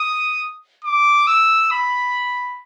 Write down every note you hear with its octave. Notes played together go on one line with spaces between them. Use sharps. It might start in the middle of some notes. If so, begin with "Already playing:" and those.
Already playing: D#6
D6
E6
B5